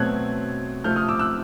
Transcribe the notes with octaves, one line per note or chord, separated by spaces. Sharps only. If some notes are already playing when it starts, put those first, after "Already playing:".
Already playing: B2 F#3 A3 C4 F#6 G#6
C3 F3 A3 C4 F6 G6
D#6 F6
D6 E6
E6 F#6